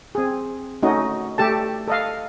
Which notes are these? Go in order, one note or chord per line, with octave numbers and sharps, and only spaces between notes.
C4 G#4
A3 C#4 D#4 F#4 D#5
A3 G4 A4 A5
A4 D#5 F5